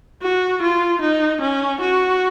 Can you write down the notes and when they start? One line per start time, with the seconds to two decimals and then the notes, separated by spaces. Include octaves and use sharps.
0.22 F#4
0.62 F4
1.02 D#4
1.41 C#4
1.81 F#4